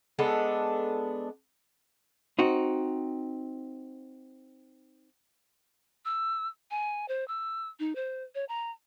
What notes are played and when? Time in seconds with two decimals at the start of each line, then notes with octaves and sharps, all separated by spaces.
0.19 G#3 B3 D4 A4
2.39 C4 D#4 F#4
6.05 E6
6.71 G#5
7.08 C5
7.28 E6
7.79 D#4
7.95 C5
8.35 C#5
8.49 A#5